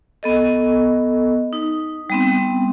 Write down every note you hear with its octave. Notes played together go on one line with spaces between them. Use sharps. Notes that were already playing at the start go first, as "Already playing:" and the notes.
B3 A4 D#5
D#4
G3 B3 C4